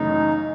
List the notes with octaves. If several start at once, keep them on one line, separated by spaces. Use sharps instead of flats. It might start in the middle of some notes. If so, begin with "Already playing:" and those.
Already playing: F#2 C#3 E3 A3 C#4 D#4